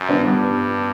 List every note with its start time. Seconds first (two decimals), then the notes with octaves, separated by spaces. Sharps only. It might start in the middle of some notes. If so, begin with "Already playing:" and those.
Already playing: F#2
0.09 B3 D4
0.24 G2 G3 B3